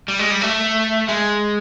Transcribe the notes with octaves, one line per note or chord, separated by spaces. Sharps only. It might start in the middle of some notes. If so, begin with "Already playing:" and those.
G3
G#3
G3
A3
G#3